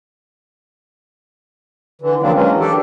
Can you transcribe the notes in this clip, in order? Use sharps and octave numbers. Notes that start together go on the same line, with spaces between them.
D3 E3
D3 F3 F#3 A#3 C4 D4
E3 F#3 G#3 C#4
D4 G4 A4